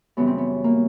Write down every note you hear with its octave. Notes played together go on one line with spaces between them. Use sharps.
F#2 C#3 E3 G3 B3
C4
B3
A#3